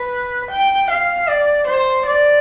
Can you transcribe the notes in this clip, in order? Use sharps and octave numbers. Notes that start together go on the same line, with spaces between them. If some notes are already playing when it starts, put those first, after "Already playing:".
Already playing: B4
G5
F5
D5
C5
D5